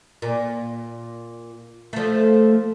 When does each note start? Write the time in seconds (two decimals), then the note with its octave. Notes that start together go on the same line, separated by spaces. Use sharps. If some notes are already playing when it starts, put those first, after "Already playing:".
0.22 A#2
1.93 F3 A3